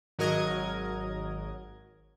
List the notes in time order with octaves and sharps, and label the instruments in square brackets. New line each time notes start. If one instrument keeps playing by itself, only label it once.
[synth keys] G#1 F#3 A#4 D#5 G#6